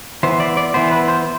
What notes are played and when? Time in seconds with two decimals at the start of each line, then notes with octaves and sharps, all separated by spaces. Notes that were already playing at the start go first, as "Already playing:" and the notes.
0.23 E3 B3 C5
0.40 D5
0.57 D5
0.74 E3 B3 C5
0.91 B4
1.08 C5